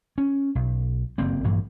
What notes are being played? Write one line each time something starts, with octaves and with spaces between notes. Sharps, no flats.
C#4
B1
F#1 G2 A#3 C4
A#1 G2 E3 A#3